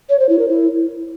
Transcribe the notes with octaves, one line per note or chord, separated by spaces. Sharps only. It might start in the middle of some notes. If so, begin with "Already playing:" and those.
C#5
C5
E4
A#4
E4